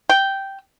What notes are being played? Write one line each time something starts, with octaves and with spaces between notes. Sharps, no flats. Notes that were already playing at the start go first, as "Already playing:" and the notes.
G5